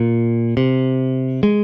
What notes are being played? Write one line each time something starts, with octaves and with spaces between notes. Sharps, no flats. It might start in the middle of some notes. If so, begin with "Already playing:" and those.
Already playing: A#2
C3
G#3